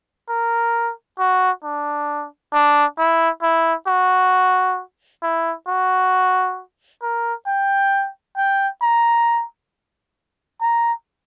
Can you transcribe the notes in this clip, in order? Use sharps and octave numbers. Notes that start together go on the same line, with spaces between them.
A#4
F#4
D4
D4
E4
E4
F#4
E4
F#4
A#4
G5
G5
A#5
A#5